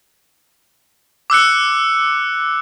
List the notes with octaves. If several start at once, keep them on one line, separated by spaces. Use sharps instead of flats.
D6 E6 F#6 C#7